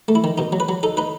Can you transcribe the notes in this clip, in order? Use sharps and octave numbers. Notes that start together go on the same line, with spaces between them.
A3
E4
D#3
B2 D#4
F#3
B4
F#3
D#4 A4
D#4 B4